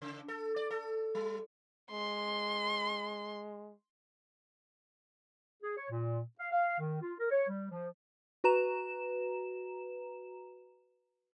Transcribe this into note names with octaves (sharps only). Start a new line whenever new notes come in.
C#3
A4
D5
A4
G3
G#3 C6
G#4
C#5
A#2
F5
F5
D#3
F4
A#4
C#5
G3
F3
F#4 B4 A#5 E7